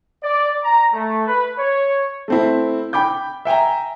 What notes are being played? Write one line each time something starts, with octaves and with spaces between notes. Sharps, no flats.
D5
A#5
A3
B4
C#5
A3 C4 E4
G5 B5 D6 G6
E5 G5 G#5 A#5